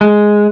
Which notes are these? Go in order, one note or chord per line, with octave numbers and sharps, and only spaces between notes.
G#3